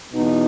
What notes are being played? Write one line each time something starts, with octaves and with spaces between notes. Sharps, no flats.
E2 B2 D#4